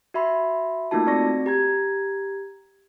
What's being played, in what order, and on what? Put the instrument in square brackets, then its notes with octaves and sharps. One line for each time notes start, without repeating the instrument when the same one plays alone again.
[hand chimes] F#4 E5 B5 C6
A3 A#3 D#4 F4 F#4 A5
C4 F#4 D5 C#6 A#6
G4 A#5 G#6